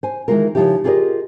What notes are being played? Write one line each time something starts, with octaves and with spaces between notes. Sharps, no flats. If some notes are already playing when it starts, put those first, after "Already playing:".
C5 G#5
D#3 E3 F#3 G#3 F4 A#4
C#3 E3 F3 D#4 E4 G4
F4 G4 G#4 A#4 D5 D#5